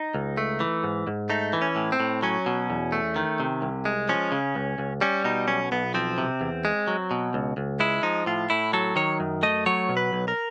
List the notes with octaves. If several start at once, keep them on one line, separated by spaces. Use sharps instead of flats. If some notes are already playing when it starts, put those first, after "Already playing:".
Already playing: D#4
C#2
A3
E3
G#2
G#2
A3 D#4
E3
C#4
A2
C4
A2
F#3 C#4
B2
E2
A3
D#3
C3
C2
G#3
F3 C#4
C#3
C#2
C#2
G3 C#4
B2 D#4
B1 C#4
B1 B3
F3 C4
C3
E2
G#3
F#3
B2
C#2
C#2
G#3 E4
F3 D#4
A2 F4
A2 E4
F#3 A4
D#3 C#5
F#2
A3 D#5
F#3 C#5
B2
B4
B1
A#4